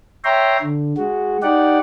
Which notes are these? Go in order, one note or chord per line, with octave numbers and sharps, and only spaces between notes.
C#5 E5 G5 A#5 C6
D3
G#3 F#4
D#4 G4 D5 F#5